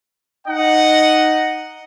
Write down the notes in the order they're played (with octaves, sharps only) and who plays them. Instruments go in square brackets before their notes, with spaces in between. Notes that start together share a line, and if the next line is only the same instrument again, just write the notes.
[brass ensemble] D#4 D#5 F#5